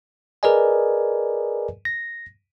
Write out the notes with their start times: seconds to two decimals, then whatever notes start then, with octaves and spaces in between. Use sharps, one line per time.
0.43 G#4 A#4 B4 D5 D#5 G#5
1.85 A#6